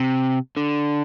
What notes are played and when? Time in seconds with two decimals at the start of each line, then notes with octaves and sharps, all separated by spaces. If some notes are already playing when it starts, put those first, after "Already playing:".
Already playing: C3
0.57 D3